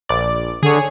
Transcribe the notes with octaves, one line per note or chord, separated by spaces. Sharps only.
A#1 D5
D3 G#4 C#5